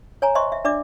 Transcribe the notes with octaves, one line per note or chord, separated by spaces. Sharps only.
C#5 G#5 A#5
C5 D#5 E5 C6 C#6
E5
D4 D5 E5 D6